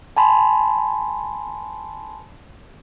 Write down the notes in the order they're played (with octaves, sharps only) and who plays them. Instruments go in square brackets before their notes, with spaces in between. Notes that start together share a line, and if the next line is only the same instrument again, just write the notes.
[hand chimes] G#5 A5 B5 C6